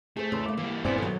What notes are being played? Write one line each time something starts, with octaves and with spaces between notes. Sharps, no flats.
A3 G#4 C5
E2 C#3 D4 A5 C6 E6
A3 A#3 D6
E3 G3 A#3
G2 A#2 B3 C4 E4 G#4 C5 D5
D#3 F#3 A4